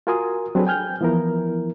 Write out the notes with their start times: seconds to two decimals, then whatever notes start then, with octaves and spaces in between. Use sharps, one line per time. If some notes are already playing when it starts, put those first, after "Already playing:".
0.07 F4 F#4 A#4 G#5 C6 D#6
0.55 F#3 C4 D4 G#4 A4 B4
0.67 G5 G#5 F6 G6
1.01 E3 F3 B3 E4 A#4